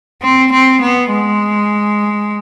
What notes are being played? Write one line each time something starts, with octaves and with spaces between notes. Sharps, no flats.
C4
C4
B3
G#3